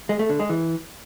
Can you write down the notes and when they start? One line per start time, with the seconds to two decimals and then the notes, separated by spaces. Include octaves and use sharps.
0.09 G#3
0.19 A3
0.29 D3
0.39 G#3
0.49 E3